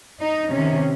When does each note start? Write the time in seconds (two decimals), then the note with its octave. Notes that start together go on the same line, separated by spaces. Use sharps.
0.21 D#4
0.53 C3 D#3 C#4